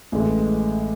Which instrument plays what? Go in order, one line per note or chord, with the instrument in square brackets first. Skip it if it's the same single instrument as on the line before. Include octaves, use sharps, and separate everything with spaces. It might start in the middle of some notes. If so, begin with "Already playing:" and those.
[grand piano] A1 A2 G#3